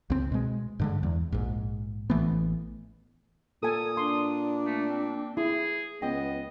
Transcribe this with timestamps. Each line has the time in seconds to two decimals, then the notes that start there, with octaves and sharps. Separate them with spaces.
0.10 C#2 C4
0.32 B2 G#3
0.79 G2 D3 G#3
1.03 E2
1.32 A#1 G#2
2.10 A1 E3 A3 B3
3.63 A#2 A4 G#5 D#6
3.97 D4 C6
4.66 A3
4.89 C4
5.37 E4 G#4
6.02 C#2 B3 D#5 G5